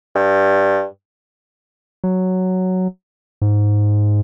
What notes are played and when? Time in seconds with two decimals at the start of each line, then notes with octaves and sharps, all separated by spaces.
0.15 G2
2.04 F#3
3.42 G#2